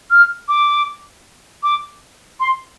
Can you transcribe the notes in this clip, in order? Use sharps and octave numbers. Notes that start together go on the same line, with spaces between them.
F6
D6
D6
C6